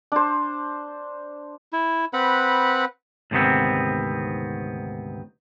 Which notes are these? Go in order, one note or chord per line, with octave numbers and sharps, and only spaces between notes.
D4 C5
E4
C4 B4 F#5 B5
D2 G#2 C3 D#3 B3 C4